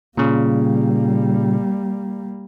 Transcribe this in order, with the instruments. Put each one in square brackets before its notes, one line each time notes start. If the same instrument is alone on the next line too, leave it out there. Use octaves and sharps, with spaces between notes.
[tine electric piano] A#2 C#3 [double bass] G3 A#3